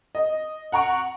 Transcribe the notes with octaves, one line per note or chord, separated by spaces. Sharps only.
D#5
F#5 A#5 C#6 D7